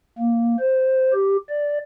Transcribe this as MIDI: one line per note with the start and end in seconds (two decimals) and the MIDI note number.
0.19 0.56 58
0.59 1.13 72
1.14 1.37 67
1.50 1.79 74